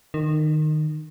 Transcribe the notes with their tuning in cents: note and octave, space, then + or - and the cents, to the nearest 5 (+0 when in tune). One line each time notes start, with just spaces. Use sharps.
D#3 -20